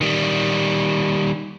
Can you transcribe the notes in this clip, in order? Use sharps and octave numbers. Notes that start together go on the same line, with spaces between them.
D#3 G3